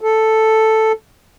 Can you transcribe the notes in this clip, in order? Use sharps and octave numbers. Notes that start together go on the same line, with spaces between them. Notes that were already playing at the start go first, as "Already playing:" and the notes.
A4